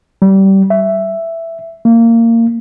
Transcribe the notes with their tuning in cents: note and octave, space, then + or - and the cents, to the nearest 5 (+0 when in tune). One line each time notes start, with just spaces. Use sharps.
G3 -20
E5 +5
A#3 -25